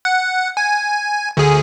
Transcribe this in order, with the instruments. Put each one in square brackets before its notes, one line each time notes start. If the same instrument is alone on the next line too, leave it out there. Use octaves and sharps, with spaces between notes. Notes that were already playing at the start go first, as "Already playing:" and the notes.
[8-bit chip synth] F#5
G#5
D2 G#4